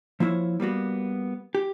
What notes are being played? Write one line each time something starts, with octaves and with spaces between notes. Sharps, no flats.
F3 A#3 E4 C5 C#5
G3 A#3 B3 F#4
G4